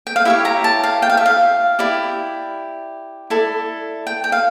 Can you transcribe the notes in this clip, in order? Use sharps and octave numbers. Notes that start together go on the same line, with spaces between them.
G5
F5
E4 G4 C#5 E5
A#5
A5
F5
G5
F5
E5
F5
E4 G4 D5
E4 A4 D5
G5
G5
F5